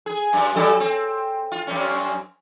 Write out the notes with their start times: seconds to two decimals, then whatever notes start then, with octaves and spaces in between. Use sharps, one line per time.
0.06 G#4
0.33 F#2
0.56 G2 F#3 A4
0.80 C4
1.52 F4
1.67 F#2 C4 C#4